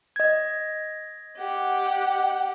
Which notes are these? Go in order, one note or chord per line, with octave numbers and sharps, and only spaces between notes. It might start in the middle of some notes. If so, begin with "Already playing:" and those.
D#5 G#6
G4 F#5